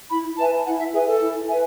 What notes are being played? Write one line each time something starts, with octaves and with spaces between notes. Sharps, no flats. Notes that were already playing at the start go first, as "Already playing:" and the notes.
E4 B5
B4 E5 G#5 A5
E4 F#5
E5
G#4 B4 E5 G#5
A4
E4
B4 E5 G#5